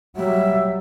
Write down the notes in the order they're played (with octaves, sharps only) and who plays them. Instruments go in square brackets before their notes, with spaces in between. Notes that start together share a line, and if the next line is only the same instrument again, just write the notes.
[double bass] F#3 G3 [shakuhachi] E5